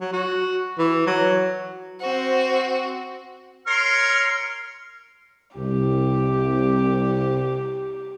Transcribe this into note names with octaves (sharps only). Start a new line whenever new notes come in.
F#3
F#4
E3
F#3
C4 F#4 C5
A#4 C#5 C6 F6
C2 G4